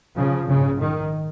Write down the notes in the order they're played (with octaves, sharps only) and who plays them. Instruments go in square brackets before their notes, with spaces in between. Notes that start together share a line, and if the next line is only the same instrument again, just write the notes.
[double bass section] C#3 F3
A#1 G#2 C#3
D#3